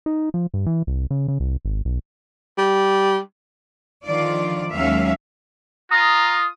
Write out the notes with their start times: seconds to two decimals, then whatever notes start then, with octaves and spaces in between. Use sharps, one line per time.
0.06 D#4
0.34 F3
0.54 G2
0.66 E3
0.87 C2
1.11 C#3
1.28 C#3
1.40 C2
1.65 G#1
1.85 B1
2.58 G3
4.07 D3 D#3 F3 F4 D5
4.71 D#2 F#3 G#3 C#4 E5 F5
5.91 F4 A#5 D#6